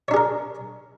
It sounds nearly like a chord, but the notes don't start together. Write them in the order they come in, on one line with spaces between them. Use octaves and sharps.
C#5 D4 G#4 A#4